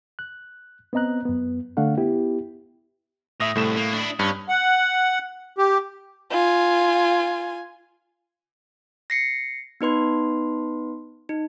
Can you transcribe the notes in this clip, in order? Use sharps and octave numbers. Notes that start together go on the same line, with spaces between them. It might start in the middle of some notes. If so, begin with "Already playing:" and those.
F#6
B3 C4 D#5 A#5 F#6
F#2 B3
D3 A3 D4 F5 F#5
B3 E4 G4
A2 E5 D#6 A#6
C2 A2 A3 E7
A#3
D4 E4
G2 C#4
F#5
G4
F4 G#5
A#6 C7 C#7
B3 D#4 B4 C6
D#4